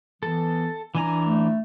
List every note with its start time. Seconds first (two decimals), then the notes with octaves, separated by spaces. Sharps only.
0.23 E3 B3 A4
0.95 E3 D4 G#5 A#5
1.25 A3